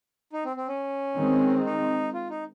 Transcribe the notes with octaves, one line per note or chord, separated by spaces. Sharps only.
D#4
C4
C4
C#4
D#3 G#3 C4
D#4
F4
D#4